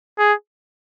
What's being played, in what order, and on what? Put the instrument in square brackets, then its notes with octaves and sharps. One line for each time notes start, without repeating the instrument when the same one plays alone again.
[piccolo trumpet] G#4